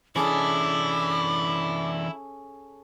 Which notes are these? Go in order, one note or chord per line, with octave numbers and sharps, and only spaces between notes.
E3 C#4 D4 E4 G#4 A4 D6